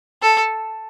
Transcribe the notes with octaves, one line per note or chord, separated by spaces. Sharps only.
A4